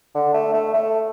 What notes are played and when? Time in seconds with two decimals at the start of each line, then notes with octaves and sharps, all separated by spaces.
0.15 D3
0.34 A3
0.54 A3
0.74 A3